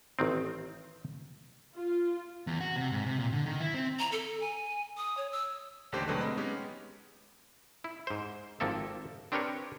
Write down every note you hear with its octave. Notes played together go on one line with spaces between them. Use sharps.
A1 D#3 C4
F4
E2
F#4
C3
G#2
C3
A#2
D3
D#3
E4
C4
A#5
A4
G#5
D#6
C#5
E6
A1 D#2 D3 G4 C5 G5
B2 D3 F#3 G#3 A3 B4
C4 D#5 B5
G#3 B3 C#4 D#4 G4
E4
G#2 C5
G#1 F3 A#3 C4 A4 E5
C4 D4 G4 A#4 B4 C#5